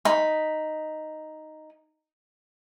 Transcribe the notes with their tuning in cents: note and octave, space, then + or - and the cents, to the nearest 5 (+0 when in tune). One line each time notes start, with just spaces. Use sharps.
D#4 +0 B5 +0